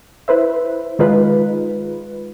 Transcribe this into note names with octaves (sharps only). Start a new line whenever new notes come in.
E4 B4 C5 E5
D#3 G#3 D#4 F4 B4